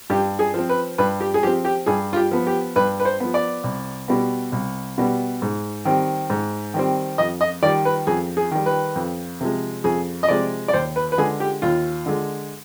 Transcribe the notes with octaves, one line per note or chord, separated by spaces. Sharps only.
G2 G4
G#4
F3 C4
B4
G2 B4
G4
G#4
F3 C4 G4
G4
G2 G#4
F4
G4
F3 B3
G4
G2 B4
B4
C5
F3 B3
D5
C2
B2 G3 B3
C2
B2 G3 B3
G#2
D#3 G3 C4
G#2
D#3 G3 C4
F2 D#5
D#5
D#3 G3 D5
B4
F2 G#4
G#4
D#3 G3
B4
F2
C3 F3 G#3
F2 G#4
D#5
C3 F3 G#3 D5
D5
D#2 C5
B4
B4
D3 G#3 G#4
G4
D#2 F4
D3 G#3